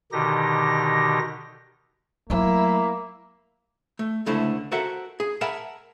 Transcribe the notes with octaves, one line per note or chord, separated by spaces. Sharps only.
B2 D3 D#3 D#4 G4 A#6
F#3 A3 A#3 E4
A3
C#2 D3 A3 E4 C5
F#4 A4 A#4 C5 E5 F#5
G#4
A#4 E5 F#5 G#5 A5 B5